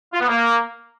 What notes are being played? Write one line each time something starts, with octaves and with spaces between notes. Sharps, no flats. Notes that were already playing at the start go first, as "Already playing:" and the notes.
F4
B3
A#3